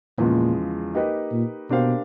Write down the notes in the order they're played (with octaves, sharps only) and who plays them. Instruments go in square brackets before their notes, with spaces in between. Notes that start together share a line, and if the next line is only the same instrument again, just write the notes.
[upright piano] E2 C#3 F3 G#3 [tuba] A#2
[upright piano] A#3 D#4 G4 B4 D#5
[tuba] A#2
[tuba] B2 [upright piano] A#3 D4 G4 C5 F5